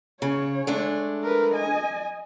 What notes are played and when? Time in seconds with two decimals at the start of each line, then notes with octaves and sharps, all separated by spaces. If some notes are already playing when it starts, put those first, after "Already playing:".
0.22 C#3 C#5
0.67 G#3 A3 D4
1.23 A#4 B4
1.54 D#5 G#5